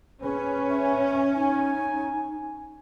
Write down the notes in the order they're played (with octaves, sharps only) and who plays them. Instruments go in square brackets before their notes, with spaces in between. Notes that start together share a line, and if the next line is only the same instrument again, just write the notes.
[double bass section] C#4 [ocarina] G#4 [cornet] B4
[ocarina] E5
[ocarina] D#4 [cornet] G#5